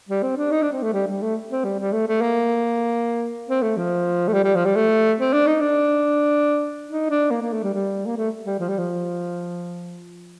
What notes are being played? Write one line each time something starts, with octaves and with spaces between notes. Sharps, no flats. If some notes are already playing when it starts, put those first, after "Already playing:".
G3
C4
D4
D#4
D4
C4
A3
G3
G3
A3
C4
G3
G3
A3
A3
A#3
C4
A3
F3
A3
G3
G3
F3
G3
A3
C4
D4
D#4
D4
D#4
D4
A#3
A#3
A3
G3
G3
A#3
A3
G3
F3
G3
F3